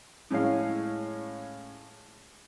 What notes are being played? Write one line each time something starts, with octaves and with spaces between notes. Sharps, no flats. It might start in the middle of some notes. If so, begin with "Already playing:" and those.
A2 G#3 C#4 F5